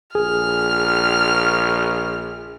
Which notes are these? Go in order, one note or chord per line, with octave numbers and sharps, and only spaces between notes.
A#1 G#4 F6